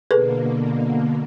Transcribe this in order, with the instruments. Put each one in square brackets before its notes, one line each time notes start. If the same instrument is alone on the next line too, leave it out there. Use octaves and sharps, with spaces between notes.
[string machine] B2 D3 A#3 [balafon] G#4 A4 B4